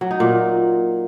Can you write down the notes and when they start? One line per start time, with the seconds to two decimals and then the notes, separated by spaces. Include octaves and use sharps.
0.01 F#3
0.11 D#4
0.20 A#2